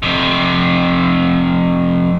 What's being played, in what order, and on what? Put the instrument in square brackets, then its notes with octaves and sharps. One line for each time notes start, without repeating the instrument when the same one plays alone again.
[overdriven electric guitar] F2 C3